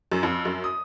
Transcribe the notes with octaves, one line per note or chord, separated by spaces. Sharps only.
F#2
F2
F#2
D#6